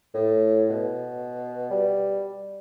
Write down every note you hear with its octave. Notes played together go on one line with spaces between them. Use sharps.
A2
B2
G3